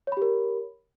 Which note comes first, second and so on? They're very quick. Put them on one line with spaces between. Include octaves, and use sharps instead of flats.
C#5 B5 G4 A#4